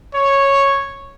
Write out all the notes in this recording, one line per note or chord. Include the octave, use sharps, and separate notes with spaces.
C#5